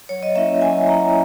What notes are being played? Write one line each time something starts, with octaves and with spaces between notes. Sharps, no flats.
F#3 C#5
D#5
A#3 C#4 E4 E5
F#3 G#5
A#3 C#4 E4 A#5